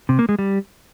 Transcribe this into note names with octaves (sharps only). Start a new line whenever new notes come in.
C3
A#3
G#3
G3